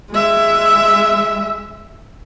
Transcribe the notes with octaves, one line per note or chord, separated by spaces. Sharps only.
G#3 E5